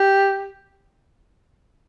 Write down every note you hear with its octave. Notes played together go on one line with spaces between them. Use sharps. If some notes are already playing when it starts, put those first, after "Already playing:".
Already playing: G4